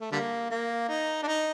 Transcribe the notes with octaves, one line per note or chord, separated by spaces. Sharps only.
A3
D3 G3 A#3
A#3
D#4
D4
D#4